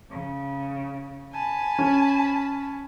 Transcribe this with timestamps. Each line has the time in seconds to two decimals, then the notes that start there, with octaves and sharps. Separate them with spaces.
0.10 C#3
1.32 G#5 A5 B5
1.79 C#4